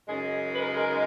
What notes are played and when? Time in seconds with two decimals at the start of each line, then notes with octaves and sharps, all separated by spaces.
0.07 F#2 C#3 G#3 D#4 G#4
0.53 B4
0.61 A#4
0.68 G#4
0.75 A#4